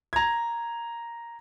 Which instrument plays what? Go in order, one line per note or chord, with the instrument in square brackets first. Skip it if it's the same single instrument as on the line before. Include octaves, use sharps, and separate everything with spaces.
[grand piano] A#5 G#6